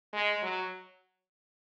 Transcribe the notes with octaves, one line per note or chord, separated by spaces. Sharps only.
G#3
F#3